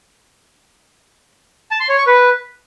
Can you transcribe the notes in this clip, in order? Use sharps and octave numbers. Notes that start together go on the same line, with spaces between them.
A5
C6
C#5
C#6
B4